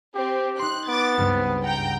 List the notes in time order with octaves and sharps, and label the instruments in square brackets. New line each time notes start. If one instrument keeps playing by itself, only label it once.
[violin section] C4 [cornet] G4
[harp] D#4 C6 [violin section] F#6
[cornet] B3 [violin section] D6 A6
[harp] C#2 G2 G3 [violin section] C4
[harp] F#5 [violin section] G5 A#5 G6